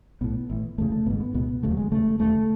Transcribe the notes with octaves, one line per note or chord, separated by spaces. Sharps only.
B1 A2 B3
A1 A2
E1 E2 C#3 A3
A3
G#1 G#2 B3
B3
C#2 B2 B3
E1 D#2 C#3 A3
F#3
G#3
E1 D#2 C#3 A3
E1 D#2 C#3 A3